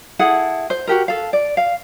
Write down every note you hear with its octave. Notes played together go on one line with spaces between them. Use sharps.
E4 G#4 A4 F#5
C5
F#4 G4 A#4
A4 F5
D5
F5